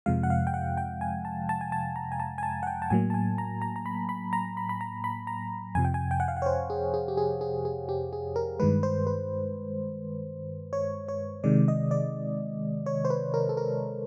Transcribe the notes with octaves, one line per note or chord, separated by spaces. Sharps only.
F2 C3 F3 G#3 F5
F#5
F5
G5
F#5
G5
G#5
A5
A5
G#5
A5
A#5
G#5
A5
G#5
A5
F#5
G5
A5
A2 F#3 A#3 G#5
A5
G#5
A#5
A#5
A#5
B5
B5
A#5
B5
B5
A#5
B5
A#5
F2 C3 F3 G#5
G5
G#5
G5
F#5
F5
F#5
C#5
C5
G#4
G#4
G4
G#4
G#4
G#4
G4
G#4
A#4
G2 D#3 G#3 B4
C5
B4
C#5
C#5
C3 D#3 G#3 D5
D#5
D5
C#5
C5
B4
A#4
A4
A#4